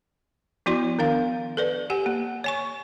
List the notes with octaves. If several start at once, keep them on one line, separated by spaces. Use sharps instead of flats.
F3 B3 E4 F#4 D5 C6
D#3 B3 D4 F5
A4 B4 D5
G4 F#5 G#5
A#3
C#5 G#5 C#6